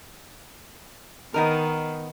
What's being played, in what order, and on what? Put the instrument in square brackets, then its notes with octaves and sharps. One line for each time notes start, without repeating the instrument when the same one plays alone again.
[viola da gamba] D#3 [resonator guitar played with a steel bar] B3 D#4 A#4